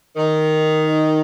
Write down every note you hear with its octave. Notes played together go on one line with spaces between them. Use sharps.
D#3